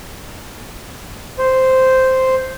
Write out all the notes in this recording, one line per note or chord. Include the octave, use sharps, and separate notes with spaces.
C5